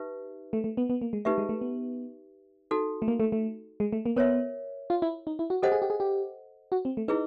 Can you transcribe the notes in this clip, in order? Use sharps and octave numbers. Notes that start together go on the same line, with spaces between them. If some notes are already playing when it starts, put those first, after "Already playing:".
Already playing: D#4 G4 B4 E5
A3
A3
B3
B3
A#3
G#3
A3 D#4 G4 B4 E5
G#3
A3
B3
D#4 F#4 A4
A3
A#3
A3
A3
G#3
A3
A#3
B3 A#4 C#5 E5
F4
E4
D#4
E4
F#4
G4 A4 C5 D#5 F#5
G#4
G4
G#4
G4
F#4
C4
A3
D#4 E4 G#4 B4